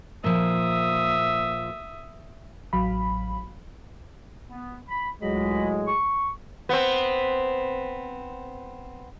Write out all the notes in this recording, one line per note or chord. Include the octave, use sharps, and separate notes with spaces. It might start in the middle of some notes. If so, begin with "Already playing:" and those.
A#2 F3 E5 D#6
A1 F#3 F5 B5
B3
B5
C#2 A2 F#3 G#3 D#5 B5
C#6
B3 C4